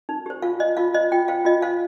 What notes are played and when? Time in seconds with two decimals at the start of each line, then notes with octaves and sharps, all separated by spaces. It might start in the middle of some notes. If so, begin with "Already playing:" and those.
0.09 D#4
0.26 G4 C5
0.42 F4 F5
0.60 C5 D#5
0.77 F4 F5
0.94 C5 D#5
1.12 F4 G5
1.28 C5 F5
1.45 F4 D#5
1.62 C5 F5